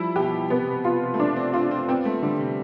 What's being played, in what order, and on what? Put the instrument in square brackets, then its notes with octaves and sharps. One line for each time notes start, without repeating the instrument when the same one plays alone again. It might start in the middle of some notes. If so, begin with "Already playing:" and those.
Already playing: [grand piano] F3 G3 [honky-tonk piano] E4
[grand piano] B2 [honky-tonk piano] G4
[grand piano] C3 [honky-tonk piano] B3
[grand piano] C3
B2
[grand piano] B2 [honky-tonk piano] F4
[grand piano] C3
A3
[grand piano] B3 [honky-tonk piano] D4
[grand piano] C4
[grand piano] C4 [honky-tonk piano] F4
[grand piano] C4
[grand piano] B3 [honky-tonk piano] C4
[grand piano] A3
[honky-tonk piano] D3 [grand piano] G3
[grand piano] C3